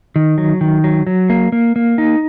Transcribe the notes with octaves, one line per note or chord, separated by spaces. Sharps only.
D#3
F#3
D#3
F#3
F#3
A#3
A#3
A#3
D#4